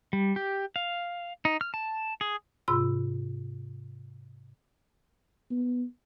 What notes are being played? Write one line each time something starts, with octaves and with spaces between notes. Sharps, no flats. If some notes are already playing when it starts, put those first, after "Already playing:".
G3
G4
F5
D#4
F6
A5
G#4
G#2 C3 F4 B5 E6
B3